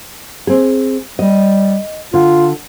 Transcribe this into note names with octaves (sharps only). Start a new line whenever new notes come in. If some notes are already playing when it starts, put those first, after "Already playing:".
C4 G#4
G3 D#5
D3 F4